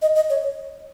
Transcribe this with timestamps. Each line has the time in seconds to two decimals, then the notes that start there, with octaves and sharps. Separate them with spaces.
0.02 D#5
0.15 D#5
0.30 C#5